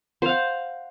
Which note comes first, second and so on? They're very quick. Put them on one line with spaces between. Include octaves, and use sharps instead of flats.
C5 F5 F#5